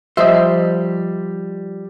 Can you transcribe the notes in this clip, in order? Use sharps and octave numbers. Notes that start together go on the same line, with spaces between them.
F3 G3 C5 D#5 E5